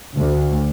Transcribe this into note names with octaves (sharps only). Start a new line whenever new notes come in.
D2